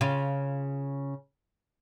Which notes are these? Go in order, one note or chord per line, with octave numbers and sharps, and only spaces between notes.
C#3 F4